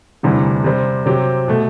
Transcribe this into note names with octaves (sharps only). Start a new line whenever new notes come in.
E1 D2 C3 E3 G3
C3 G3 C4
C3 F#3 C4 G4
B2 A3